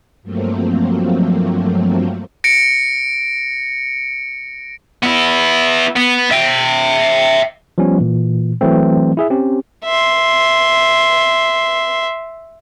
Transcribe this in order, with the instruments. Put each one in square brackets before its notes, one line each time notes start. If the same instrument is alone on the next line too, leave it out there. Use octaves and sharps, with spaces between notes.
[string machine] G2 F3 F#3 A3 A#3 C4
[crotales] A#6 C#7 D7
[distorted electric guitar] B3 E4
B3
E5 G5
[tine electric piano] F3 G3 B3 C#4
A#2 E3
E3 F#3 A3 C4
E4 G#4 E5
C4 C#4 G4
[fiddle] E5 C6